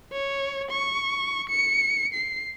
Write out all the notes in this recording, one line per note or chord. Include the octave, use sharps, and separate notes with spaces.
C#5
C#6
C#7
C7